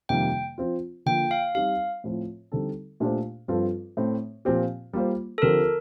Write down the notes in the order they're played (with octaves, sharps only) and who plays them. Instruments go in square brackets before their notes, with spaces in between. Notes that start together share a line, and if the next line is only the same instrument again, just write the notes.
[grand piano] F2 C3 D#3 G3 A#3 [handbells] G5
[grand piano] F3 C4 F4
[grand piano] D3 F3 A#3 F4 [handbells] G5
[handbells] F5
[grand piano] G3 C4 D#4 G4 [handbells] F5
[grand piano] A2 F3 C4
D3 G3 C4 D#4 A4
A#2 A3 D4 G4 C5
G2 F3 C4 F4 A4
A2 A3 C4
A#2 F3 C4 G4
G3 A#3 F4 C5
[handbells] A4
[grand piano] D3 F3 C4 G4 C5 [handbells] A#4